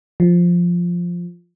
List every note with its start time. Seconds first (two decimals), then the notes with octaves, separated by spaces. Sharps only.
0.20 F3